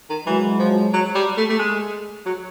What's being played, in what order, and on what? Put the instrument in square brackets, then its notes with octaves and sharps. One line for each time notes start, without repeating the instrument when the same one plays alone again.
[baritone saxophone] D#3
[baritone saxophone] E3 [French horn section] F#3 G#3
[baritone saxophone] F3
F#3
G3
A3
A3
G#3
F#3